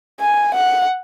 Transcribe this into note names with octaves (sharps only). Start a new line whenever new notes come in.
G#5
F#5